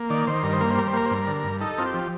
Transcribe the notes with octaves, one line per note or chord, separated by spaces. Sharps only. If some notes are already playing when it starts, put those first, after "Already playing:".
Already playing: A#3
D#3 D5
D#3 C5
G2 A#4
C5
A#3 A#4
C5
G3 A#4
C5
A#3 A#4
C5
G2 A#4
D3
G2
D#4 A4
C4 F4
G4
F3